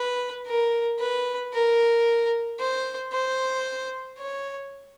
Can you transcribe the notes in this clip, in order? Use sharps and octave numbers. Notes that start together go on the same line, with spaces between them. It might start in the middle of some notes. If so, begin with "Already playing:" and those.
Already playing: B4
A#4
B4
A#4
C5
C5
C#5